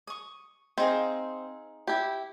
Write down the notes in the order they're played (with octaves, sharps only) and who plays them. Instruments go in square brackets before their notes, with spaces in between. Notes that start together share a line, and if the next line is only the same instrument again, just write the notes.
[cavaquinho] C#6 D#6
[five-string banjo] C4 [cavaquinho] D#4 G#4 F5
[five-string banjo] E4 G4